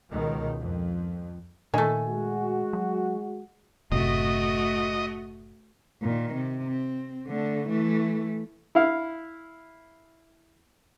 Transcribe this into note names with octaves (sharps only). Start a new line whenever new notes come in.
C#2 B2 D#3
F2
A#2 D#3 A3 G#5
G#3 F#4
F#3
F#1 A2 C3 A3 F#4 D#5
A#2 D#3
C3
C4
D3 A3
E3 A3
E4 F5